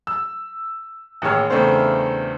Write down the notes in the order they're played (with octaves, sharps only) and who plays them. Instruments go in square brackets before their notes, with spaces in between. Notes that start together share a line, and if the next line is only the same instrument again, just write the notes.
[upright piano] E6
A1 D#2 G#4 C#5 E6 F6
E2 C#3 A3 C4 D4 C5